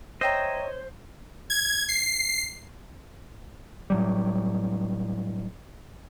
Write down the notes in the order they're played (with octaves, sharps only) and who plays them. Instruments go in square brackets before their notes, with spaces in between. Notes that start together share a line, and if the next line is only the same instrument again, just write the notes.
[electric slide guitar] C5 [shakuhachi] C#5 [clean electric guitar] D#5 [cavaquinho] E5 G5 A#5
[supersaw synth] G#6
C7
[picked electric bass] A2 F#3 G3